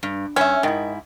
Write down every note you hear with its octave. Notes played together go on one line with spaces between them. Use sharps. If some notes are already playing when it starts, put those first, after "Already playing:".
G2
G2 C#4 E5
G#2 D#3 E4